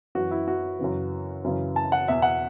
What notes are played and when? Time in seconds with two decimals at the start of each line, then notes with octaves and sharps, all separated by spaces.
0.15 F#2 E3 F#4
0.31 E4
0.48 F#4
0.79 F#2 C#3 E3
1.44 F#2 C#3 E3
1.76 A5
1.92 F#5
2.08 E2 B2 E5
2.22 F#5